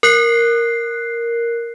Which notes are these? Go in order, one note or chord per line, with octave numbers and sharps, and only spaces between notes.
A#4 F#6 C7